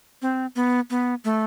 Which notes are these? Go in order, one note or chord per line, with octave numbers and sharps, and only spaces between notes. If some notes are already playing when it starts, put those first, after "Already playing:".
C4
B3
B3
A3